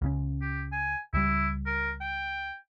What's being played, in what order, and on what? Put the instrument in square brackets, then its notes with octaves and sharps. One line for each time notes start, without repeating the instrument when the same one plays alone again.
[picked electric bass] C#2 C#3 C#4
[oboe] G4
G#5
[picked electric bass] C#2 G3 [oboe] E4
[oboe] A#4
G5